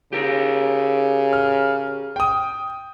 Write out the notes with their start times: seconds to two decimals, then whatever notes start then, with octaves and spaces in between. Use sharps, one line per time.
0.13 C#3 G4 A#4
1.33 F6
2.16 G5 D#6